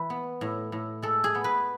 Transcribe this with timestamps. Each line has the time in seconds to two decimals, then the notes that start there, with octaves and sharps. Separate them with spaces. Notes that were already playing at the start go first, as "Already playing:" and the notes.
Already playing: E3 B4
0.10 B3
0.41 A2
0.72 A2
1.02 G#3 A4
1.24 G#4
1.35 B3
1.44 B4